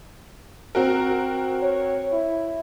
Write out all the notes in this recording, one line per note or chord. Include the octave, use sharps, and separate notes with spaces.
C4 F#4 A#4
C#5
E4